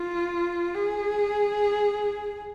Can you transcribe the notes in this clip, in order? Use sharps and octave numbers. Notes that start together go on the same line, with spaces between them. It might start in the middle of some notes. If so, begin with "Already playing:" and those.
Already playing: F4
G#4